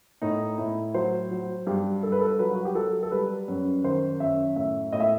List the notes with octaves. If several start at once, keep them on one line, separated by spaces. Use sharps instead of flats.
A2 D#4
A2 E4
F#3 C5
F#3
G2 G4
G2 A4
B4
A4
F#3 B4
F#4
G4
F#3 A4
A4
G3 B4
F#2
D#3 C5
F#2 E5
A2 E5
A2 D#5
E5